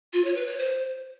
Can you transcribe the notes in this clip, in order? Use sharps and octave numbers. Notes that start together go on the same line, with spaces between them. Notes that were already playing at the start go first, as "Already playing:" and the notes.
F4
C#5
B4
C#5
C5